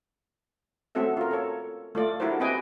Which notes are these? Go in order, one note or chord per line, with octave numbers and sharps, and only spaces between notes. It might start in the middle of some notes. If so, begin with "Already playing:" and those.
A3 C4 C#4 F#4 A4 E5
F4 A#4
A4 C#5
A3 F4 D5
D4 E4 F#4 G4 A#4 C5
C4 G4 B4 D#5 G5 G#5